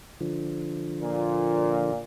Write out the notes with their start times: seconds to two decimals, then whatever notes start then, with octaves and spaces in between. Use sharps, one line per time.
0.20 D3 F3
1.02 A#2